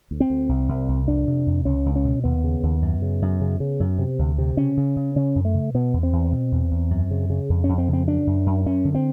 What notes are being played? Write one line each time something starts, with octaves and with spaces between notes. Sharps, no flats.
D2
C4
D2
C2
C2
C2
F2 D4
C3
F2
C#2 C#4
C#2
C#4
B2
D#2 B3
C#3
D#2
F#2
C#3
F#2
C#3
C#3
F#2
C3
D2
C3
C#3 C#4
C#3
C#3
C#3 C#4
F#2
A3
C#3
B2 B3
E2
C4
E2
B2
E2
E2
F#2
C#3
C#3
F2
F2 C#4
C4
C#3
C4
F#2 D4
F#2
F#2
F#2 C#4
D3
C4